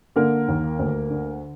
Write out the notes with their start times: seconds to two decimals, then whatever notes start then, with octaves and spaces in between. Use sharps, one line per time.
0.16 D3 A#3 A#4
0.48 D#2
0.79 D2
1.10 D3